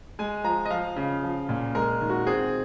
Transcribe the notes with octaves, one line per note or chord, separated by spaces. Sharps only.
G#3 G#5
F3 A#5
D#5
F3 F5
C#3
F3
A#2
G#3 A#4
D#3
F#4
C4 G#4